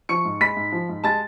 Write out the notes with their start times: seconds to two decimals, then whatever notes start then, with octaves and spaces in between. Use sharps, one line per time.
0.09 F3 C#6 C#7
0.25 G#2
0.40 G#3 B5 B6
0.57 G#2
0.72 F3
0.89 G#2
1.04 G#3 A5 A6